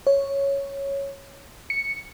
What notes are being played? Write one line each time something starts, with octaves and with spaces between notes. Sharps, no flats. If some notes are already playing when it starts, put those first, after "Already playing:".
C#5
C#7